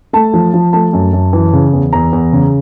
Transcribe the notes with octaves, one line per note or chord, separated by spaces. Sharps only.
A3 A5
F3
F3
A3 A5
F#2
F#2
E3
C#3
E2
E2 A#5
E2
C#3